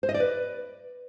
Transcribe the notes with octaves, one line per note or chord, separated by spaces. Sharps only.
C5
D#5
D5
B4